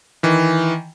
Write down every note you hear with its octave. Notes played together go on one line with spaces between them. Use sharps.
D#3 E3